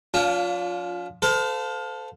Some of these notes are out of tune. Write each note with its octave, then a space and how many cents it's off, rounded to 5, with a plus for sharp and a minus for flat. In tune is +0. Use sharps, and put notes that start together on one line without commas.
F3 +20 D4 -45 F4 +0
A4 +0 C5 -35 F5 +25